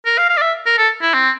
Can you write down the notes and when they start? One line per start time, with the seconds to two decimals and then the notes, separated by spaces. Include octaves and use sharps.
0.06 A#4
0.18 F5
0.30 F5
0.37 D5
0.41 E5
0.66 A#4
0.78 A4
1.02 E4
1.14 C4